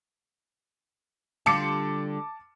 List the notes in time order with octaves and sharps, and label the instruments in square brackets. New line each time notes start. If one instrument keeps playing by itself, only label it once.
[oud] D3 G3 F4 [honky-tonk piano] A5 D6 C#7